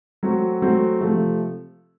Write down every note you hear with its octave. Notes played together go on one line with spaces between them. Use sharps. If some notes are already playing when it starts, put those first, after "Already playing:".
F#3 A3 C4 F#4
F#3 A3 C4 F#4
C3 F3 A3